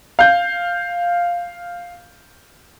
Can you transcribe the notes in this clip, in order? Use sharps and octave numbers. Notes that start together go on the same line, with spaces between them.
F5 G6